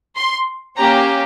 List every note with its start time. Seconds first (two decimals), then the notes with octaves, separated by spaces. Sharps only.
0.16 C6
0.76 A#3 C#4 G4 A#5